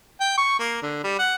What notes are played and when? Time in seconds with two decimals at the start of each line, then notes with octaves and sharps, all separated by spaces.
0.20 G5
0.37 C#6
0.59 A#3
0.82 D3
1.03 G3
1.19 F#5